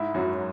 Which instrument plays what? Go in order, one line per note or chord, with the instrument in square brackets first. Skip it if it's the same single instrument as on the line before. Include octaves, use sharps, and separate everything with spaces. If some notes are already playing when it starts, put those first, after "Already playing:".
Already playing: [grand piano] G#2 [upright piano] E4
[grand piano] F#2 [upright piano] F#3